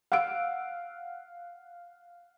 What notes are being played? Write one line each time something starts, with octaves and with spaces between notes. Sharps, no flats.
F5 F#5 E6 D7